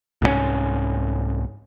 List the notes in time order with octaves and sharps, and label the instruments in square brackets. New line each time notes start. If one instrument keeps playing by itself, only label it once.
[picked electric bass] C2 G#2 F#3 C#4